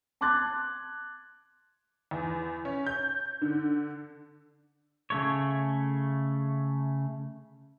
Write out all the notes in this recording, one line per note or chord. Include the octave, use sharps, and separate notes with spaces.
A5 C6 D6 F#6 G#6 A6
E2
C#4
G6
D3
C#3 A3 C#5